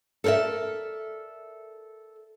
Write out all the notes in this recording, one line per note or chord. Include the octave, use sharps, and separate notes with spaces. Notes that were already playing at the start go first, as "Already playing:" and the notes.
A4 A#4 C5 D5 E5